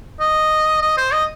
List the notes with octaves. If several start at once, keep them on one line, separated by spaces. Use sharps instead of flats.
D#5
D#5
C5
D#5